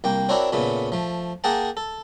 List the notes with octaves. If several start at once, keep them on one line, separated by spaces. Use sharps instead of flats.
C2 A#3 G5
C4 D4 E4 F#4 A#4 C#5
A#2 C#3 A3 B3
F3 A3
A#3 G#4 A#4 F#5 G5 A5
A4